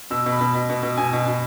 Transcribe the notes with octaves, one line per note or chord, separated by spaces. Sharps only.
B2 E6
B2
B5
B2
B2
B2
B2
B2 G#5
B2
B2